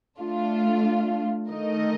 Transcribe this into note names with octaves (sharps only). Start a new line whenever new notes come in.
A3 D4 F4
D#3 A3 D#4 A#4 D#5